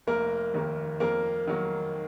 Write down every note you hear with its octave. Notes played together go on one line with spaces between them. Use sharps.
F1 A#3 A#4
D#2 D#3 A#3
F2 A#3 A#4
D#3 F#3 A#3